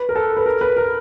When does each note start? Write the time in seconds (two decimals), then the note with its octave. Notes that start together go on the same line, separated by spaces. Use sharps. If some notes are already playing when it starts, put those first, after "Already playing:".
Already playing: B4
0.09 A#4
0.16 A4
0.37 B4
0.46 A#4
0.61 B4
0.77 A#4